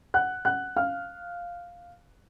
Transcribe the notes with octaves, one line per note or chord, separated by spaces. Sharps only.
F#5 F#6
F#5 F#6
F5 F6